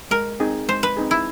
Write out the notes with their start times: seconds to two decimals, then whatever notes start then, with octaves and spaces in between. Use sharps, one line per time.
0.11 G#3 A#4
0.40 C4 D#4 G#4
0.68 G#3 C5
0.83 B4
0.97 C4 D#4 G#4
1.11 E4